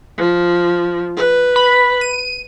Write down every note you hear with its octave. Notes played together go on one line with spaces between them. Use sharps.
F3
B4
B5
D#7